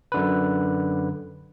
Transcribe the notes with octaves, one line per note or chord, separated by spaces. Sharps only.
F#2 D3 B4